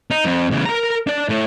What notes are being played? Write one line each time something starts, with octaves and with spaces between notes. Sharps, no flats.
D#4
F2
E2 C#3
A#4 A#5
D4 D5
A2